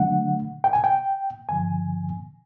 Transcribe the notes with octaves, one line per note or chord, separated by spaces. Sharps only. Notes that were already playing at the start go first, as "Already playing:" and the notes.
Already playing: D3 F#3 A3 D4 F#5
G5
G#5
G5
G2 D3 F3 G#5